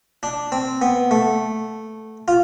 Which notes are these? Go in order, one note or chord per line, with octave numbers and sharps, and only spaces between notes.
D4
C4
B3
A3
F4